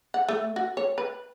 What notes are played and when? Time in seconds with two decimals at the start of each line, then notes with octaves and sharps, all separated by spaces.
0.14 F#5
0.29 A3
0.56 F#4
0.77 C#5
0.98 B4